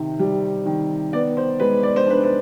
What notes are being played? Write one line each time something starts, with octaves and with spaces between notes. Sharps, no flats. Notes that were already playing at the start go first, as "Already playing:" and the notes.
Already playing: C3 D#3
G3
D#3
B3 D5
C5
G#3 B4
D5
C5
D4 B4
C5